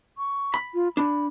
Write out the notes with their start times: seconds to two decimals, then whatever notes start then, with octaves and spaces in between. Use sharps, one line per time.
0.18 C#6
0.54 B5
0.74 F4
0.97 D4 B5